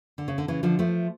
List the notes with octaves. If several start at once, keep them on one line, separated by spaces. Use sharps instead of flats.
D3
C#3
D3
C#3 E3
D3 F3
F3 A3